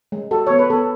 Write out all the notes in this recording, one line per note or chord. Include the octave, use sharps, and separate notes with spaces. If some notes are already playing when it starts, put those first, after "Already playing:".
G#3
F#4 A4
B3 C#5
B4
B3 A4